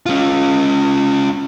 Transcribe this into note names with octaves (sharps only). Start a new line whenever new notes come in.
C#4 F4